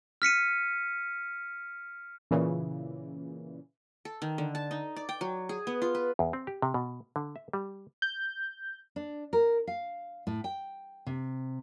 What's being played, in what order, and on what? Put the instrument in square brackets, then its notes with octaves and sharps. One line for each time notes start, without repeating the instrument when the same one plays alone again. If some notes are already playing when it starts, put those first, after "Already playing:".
[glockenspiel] F6 B6 C#7 D#7
[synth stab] A#2 C#3 E3
[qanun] A4
D#3
D3
A5
D#4
D5
G5
F#3
G#4
B3
F4
B4
[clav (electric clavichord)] E2
C4
G4
C3
B2
D3
E5
G3
[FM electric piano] G6
[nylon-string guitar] D4
A#4
F5
A2
G5
C3